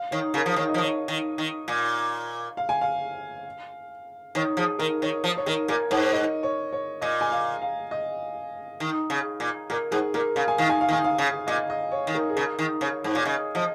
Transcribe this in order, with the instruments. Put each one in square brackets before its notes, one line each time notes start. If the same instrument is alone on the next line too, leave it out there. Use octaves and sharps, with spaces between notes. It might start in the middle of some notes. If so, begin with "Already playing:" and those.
Already playing: [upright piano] F5
[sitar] D#3 [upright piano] C#5
[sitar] C#3 [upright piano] A#4
[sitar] F3
[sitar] D#3 [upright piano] C#5
[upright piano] D#5
[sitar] F3
D#3
[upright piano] C#5
[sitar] D#3
D#3
A#2
[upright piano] F5
G#5
F5
[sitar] D#3 [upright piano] C#5
[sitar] F3 [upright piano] G#4
[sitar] D#3 [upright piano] A#4
[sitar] D#3 [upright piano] C#5
[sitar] F3
[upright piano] C#5
[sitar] D#3 [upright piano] A#4
[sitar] A#2 [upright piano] A#4
[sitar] G#2 [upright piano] C#5
[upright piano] D#5
C#5
C#5
[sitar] A#2 [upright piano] D#5
[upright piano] G#5
F5
F5
D#5
[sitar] D#3
C#3
A#2
[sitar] A#2 [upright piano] A#4
[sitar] G#2 [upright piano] G#4
[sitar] A#2 [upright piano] A#4
[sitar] C#3 [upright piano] F5
[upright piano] G#5
[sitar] D#3 [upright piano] F5
[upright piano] G#5
F5
[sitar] D#3
[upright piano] G#5
F5
[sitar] C#3
[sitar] A#2 [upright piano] D#5
[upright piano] D#5
C#5
[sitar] D#3
[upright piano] A#4
G#4
[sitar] C#3 [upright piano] A#4
[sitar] D#3
[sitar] C#3 [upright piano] C#5
[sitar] G#2
[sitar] A#2 [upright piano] C#5
[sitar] C#3 [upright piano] D#5
[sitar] F3 [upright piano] D#5